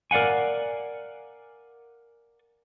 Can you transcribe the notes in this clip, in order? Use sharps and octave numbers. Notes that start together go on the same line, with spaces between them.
A#4 D5 F5 F#5 G#5